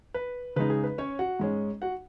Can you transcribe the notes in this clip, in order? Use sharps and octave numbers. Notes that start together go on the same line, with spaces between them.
B4
C#3 G#3 D#4 B4
G#4
B4
C#4 C#5
F#4 F#5
G#2 G#3 C#4
F#4 F#5